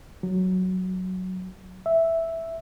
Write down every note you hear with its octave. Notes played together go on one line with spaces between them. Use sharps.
F#3
E5